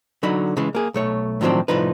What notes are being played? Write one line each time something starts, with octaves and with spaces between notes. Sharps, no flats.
D3 F#3 D#4 F#4 B5
C#3 E3 G#3
A#3 G#4
B1 A3 C#5
A2 D#3 F3 F#3 C4 D4
C2 A2 F3 D#4 B4